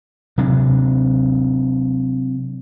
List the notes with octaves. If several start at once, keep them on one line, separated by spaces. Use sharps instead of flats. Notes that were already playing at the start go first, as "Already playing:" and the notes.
C3 F#3 D4